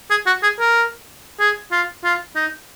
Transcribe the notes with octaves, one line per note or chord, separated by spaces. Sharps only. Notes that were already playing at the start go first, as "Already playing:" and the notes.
G#4
F#4
G#4
A#4
G#4
F4
F4
D#4